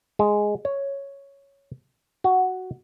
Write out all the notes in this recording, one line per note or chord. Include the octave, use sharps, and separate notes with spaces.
G#3
C#5
F#4